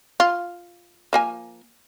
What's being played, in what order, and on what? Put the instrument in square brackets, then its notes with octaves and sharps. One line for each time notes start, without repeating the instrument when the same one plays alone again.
[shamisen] F4
F3 A#3 G#5